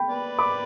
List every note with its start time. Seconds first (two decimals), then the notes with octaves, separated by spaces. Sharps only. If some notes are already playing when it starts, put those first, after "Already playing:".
Already playing: G5 B5
0.08 B4 D5
0.39 B5 D6